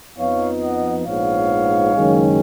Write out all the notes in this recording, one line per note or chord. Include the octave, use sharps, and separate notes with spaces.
F2 F3 B3 D#4 C#5 F5
D#5 F#5
A#1 G#2 F3 B3 C#5 F5
F#1 F#2 D#3 G#3 C#4